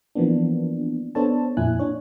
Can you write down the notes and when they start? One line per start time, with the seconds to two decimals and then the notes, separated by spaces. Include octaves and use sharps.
0.15 E3 F3 A#3 B3 D4
1.15 B3 D4 A4 C5 C#5 A5
1.57 F2 A#2 E4 G#5 F#6
1.79 D4 C#5